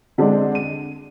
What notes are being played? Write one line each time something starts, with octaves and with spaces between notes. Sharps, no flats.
D3 G#3 C4 D4
D#7